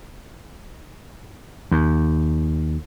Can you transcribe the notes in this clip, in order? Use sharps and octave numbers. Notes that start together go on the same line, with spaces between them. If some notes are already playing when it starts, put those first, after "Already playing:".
D#2